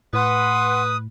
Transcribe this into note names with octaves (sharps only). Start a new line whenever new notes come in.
A2 B4 F#5 C6 D#6